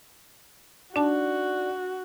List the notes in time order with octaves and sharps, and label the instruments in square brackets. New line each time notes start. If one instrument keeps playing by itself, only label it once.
[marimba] D4 A5 [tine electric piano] D#4 D5 [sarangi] F#4